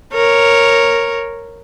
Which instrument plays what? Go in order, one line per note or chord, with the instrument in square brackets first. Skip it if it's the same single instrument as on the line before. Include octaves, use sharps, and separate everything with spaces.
[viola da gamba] A#4 C#5